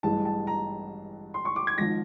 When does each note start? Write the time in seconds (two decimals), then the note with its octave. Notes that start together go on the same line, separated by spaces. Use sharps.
0.03 A1 G2 E3 G#3 A5
0.25 A5
0.47 A#5
1.34 C6
1.45 C#6
1.56 D6
1.67 G#6
1.78 G#1 G#2 F3 A#6